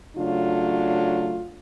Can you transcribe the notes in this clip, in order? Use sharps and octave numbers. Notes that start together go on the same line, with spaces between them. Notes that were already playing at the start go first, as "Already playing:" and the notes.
C#3 F#3 A3 D4 F4